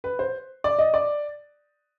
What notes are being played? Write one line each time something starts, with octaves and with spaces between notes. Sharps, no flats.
B4
C5
D5
D#5
D5